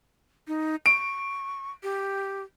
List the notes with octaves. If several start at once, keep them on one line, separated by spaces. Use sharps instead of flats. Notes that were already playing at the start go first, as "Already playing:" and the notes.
D#4
C#6 D7
G4